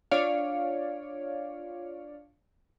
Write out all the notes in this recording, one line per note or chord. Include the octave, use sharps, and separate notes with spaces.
D4 F4 C#5 D5 F5